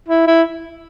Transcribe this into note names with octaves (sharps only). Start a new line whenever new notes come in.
E4
E4